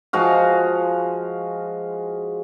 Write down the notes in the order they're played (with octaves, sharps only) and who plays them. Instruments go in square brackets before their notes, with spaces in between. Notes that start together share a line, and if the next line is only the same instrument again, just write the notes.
[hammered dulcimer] F3 G#3 F#4 F5